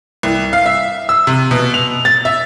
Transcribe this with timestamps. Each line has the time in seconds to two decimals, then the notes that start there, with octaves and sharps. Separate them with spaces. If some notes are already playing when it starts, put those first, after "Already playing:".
0.23 C2
0.53 F5
0.66 E5
1.09 E6
1.27 C3
1.51 B2
1.74 F7
2.05 A6
2.25 E5